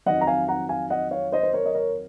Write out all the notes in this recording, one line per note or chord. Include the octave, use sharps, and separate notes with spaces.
F2 D#3 F#3 D#5 F#5
A#5
F5 G#5
F#5 A#5
F5 G#5
D#5 F#5
C#5 F5
C5 D#5
C5
A#4 C#5
D#5
A#4 C#5